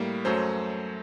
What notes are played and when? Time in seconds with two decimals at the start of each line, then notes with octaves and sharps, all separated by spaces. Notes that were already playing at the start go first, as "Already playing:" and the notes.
Already playing: A2 G3 A#3
0.25 F#2 F#3 A3 C5